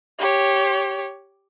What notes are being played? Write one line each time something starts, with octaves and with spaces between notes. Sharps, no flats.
G4 C#5